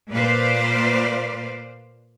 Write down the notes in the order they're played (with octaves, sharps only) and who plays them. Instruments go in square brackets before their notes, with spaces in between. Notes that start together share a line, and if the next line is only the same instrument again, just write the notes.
[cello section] A#2 B4 C5 D5 F5